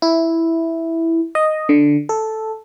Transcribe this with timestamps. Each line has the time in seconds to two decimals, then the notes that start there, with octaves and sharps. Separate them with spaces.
0.02 E4
1.35 D#5
1.69 D3
2.09 A4